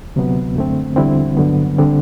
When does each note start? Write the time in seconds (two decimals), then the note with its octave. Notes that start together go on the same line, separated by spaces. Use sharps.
0.16 D2 C3 F#3 B3
0.56 F#2 D3 A3 C4
0.96 E2 D3 G3 C4 E4
1.37 G2 D3 F#3 B3
1.79 D3 G3 C4 D4